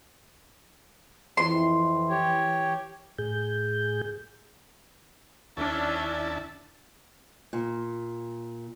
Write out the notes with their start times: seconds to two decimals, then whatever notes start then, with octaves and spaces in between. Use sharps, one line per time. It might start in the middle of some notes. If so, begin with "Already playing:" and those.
1.37 F2 E3 E4 C6
2.10 G4 C#5
3.18 A2 G#4 G6
5.57 D#2 C#4 D4 E4 E5 A5
7.53 A#2